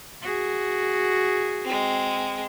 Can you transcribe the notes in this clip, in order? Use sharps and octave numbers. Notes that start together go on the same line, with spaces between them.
F#4 G#4
G#3 C4